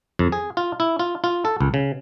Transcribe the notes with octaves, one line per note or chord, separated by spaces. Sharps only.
F2
G#4
F4
E4
F4
F4
A4
C#2
C#3